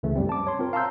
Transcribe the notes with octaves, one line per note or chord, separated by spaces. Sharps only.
C#2 C#3 E3 A3
F#2 G3 C4
A5 D6
C#5 C6
C4 F4 A#4
F5 A5 A#5 C6 E6 G6